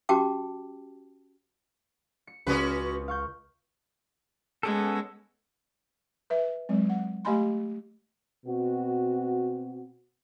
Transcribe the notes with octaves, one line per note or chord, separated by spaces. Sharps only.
C#4 F#4 G4 G5 A5 D6
C#7
C#2 C#4 F#4 B4 D#6
F5 C#6 G6
G#3 B3 C#4 A4
B4 E5
F#3 G#3 C4
F#5
A3 G4 D#5 G#5 B5 C6
B2 C4 F#4